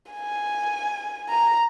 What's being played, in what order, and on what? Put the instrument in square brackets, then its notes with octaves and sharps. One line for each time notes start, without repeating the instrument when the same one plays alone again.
[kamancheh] G#5
A#5